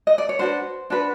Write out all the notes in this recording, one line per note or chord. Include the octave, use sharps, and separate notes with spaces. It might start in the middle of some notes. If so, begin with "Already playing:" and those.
D#5
D5
C#5
D4 F#4 B4 C5
D4 F#4 B4